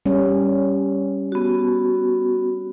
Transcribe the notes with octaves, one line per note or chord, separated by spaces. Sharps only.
G3 C#4
B3 F#4